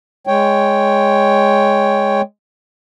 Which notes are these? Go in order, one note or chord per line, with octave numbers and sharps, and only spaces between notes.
G#3 C#5 G5